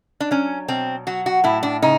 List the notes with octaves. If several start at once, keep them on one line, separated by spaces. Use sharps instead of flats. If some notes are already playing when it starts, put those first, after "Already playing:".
D4
F#3 C#4
B2 C4
F#3 F#4
F#4
A2 E4
D4
C#3 D#4